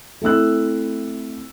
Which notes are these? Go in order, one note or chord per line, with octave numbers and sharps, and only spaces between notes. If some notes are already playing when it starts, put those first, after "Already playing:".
A3 C4 E4 E6 F#6